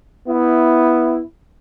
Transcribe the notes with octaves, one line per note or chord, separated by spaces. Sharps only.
B3 E4